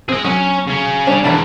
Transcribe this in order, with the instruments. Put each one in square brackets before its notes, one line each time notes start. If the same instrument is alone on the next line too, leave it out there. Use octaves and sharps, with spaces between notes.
[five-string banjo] C4 [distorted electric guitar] G#4 D#5
[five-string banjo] F#3 [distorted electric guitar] C#4
[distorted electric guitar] C#3 C#4
[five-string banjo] G3 D4 C#5
[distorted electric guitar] G#2 E3 [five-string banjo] D4 A5 B5